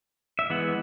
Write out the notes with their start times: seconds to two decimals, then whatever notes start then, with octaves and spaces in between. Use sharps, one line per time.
0.39 E5
0.50 E3 G#3 B3 F#5